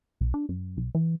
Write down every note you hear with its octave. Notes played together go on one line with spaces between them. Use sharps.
B1
D4
F#2
B1
E3